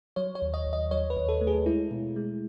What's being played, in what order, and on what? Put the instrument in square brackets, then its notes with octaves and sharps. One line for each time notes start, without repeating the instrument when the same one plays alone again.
[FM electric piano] F#3 C#5
C#5
D#2
D#5
D#2
D#5
F#3 C#5
B4
D#2
A4
A3
G#4
G#3 E4
B2
G#3